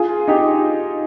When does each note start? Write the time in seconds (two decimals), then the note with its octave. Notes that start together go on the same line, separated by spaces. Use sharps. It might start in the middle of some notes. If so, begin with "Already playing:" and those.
Already playing: F4 G#4
0.28 D#4 G4